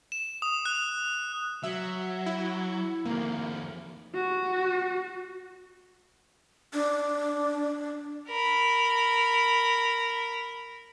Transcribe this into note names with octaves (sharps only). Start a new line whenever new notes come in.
E7
D#6
F#6
F#3 E5
E4
F2 D#3 A#3
F#4
D4
A#4 B5